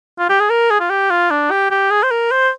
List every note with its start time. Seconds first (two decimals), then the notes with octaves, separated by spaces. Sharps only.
0.19 F4
0.30 G4
0.40 G#4
0.50 A#4
0.71 G#4
0.80 F4
0.90 G4
1.11 F4
1.31 D4
1.51 G4
1.71 G4
1.91 G#4
2.04 C5
2.11 A#4
2.32 C5